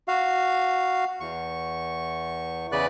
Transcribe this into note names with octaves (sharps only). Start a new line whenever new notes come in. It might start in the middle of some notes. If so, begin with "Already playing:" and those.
F#4 F5
E2 C#6
E2 C#3 B4 D5 F#6